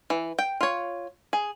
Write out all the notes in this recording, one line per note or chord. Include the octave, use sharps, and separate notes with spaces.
E3
G5
F4 C#5
G#4